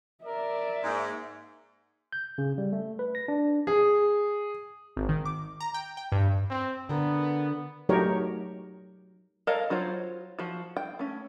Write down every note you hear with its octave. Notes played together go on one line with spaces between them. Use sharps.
A#4 D5 E5
G#2 A#3
G6
C#3
G3
A3
B4
A#6
D4
G#4
G#1
D#3
D6
A#5
G5
G5
G2
C4
D3 B3 A#4
F#3 A3 D#4 G4 A#4 C#5
A4 A#4 C#5 D#5 F5
F#3 F4 C5 C#5
F3 F#4
G5
A3 C#4